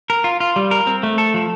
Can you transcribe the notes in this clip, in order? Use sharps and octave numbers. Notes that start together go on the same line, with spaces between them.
A#4
F4
F4
G3
A#4
C4
A3
A4
F3